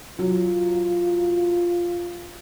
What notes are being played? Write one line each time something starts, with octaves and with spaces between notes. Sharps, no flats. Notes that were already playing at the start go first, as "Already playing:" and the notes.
F#3 F4